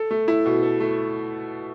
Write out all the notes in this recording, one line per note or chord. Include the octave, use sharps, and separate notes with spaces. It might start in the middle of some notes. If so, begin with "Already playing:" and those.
Already playing: A4
A3
E4
B2
A4
A3